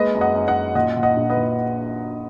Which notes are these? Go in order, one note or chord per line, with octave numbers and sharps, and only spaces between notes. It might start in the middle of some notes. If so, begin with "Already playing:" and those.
Already playing: G#3 A#3 B4 D#5
F#2
D#5 F#5
F#2
D#5 F#5
F#2
A#2 D#5 F#5
A#2
D#5 F#5
A#1
B4 D#5
A#2